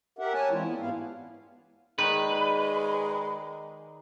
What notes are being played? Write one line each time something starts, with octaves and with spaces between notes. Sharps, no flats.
G4 A#4 E5 F#5
C#5 G#5 A5
E3 G#3 C4 D4 E4 F4
B3
G#2 G3 B3 E4 F5
D#3 G#3 B4 D5